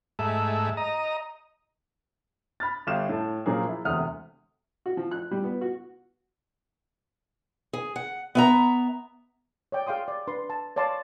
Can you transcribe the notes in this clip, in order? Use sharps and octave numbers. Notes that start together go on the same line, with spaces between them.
G#2 A3 E5
D#5 A#5
B5 F6 A6
G1 G4 F5 F6 E7
A2 A5
A#2 F3 F#3 A#3 G#4
E4
E1 D2 C3 F#5 D#6 F6
F#4
F3
F#6
G3
B3
F#4
G#4
F#5
B3 E5 A#5
C#5 D5 G5
G#4 F5 G5 C6 D#6
D5
D4 B4 C6
A5
C#5 D5 F5 A5 C6